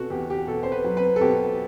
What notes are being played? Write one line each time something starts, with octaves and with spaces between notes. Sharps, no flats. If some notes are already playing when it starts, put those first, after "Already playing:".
Already playing: B2 F#4 A4
E2 G4
G4
B2 A4
C5
B4
F#3
B4
A4
B2 G4